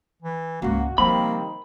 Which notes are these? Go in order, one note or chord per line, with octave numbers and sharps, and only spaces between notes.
E3
C#2 G#2 A#3 F#4
C3 D#3 F3 G3 A#3 C4 B5